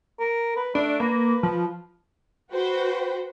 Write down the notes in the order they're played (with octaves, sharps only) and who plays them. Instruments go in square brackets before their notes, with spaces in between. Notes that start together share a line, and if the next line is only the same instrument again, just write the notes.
[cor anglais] A#4
B4
[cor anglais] A3 [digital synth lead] D4
[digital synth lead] A#3 [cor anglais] B4
[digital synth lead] F3
[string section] F#4 B4 C5 G5